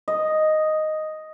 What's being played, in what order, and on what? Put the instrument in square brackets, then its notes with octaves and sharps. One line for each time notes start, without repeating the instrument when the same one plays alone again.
[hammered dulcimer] D#5